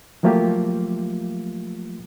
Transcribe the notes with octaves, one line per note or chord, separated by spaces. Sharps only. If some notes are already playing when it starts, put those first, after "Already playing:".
F3 F#3 A3 A#3 F4 G4